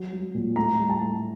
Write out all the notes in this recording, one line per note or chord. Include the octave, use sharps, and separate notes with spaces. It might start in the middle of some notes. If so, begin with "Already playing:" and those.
Already playing: F#3
F#3
A#2
A2 A#5
G3
A5
A2